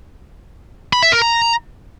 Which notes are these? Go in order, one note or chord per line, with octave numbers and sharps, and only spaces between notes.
B5
E5
A#4
A#5